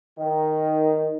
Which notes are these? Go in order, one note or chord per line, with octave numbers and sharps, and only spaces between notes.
D#3